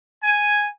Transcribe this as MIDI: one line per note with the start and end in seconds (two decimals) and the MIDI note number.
0.23 0.66 80